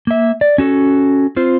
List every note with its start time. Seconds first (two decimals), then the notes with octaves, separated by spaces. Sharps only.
0.07 A#3 E5
0.41 D5
0.58 C#4 F#4 A4
1.36 C4 F4 C5